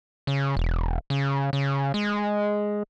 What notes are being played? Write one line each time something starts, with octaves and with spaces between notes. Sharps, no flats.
C#3
E1
C#3
C#3
G#3